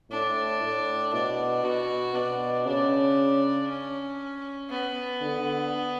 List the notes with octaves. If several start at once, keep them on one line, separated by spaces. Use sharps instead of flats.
A2 D4
A2
B2 D4
B2 F#4
B2 D4
C#3 D4
C#4
B3
D3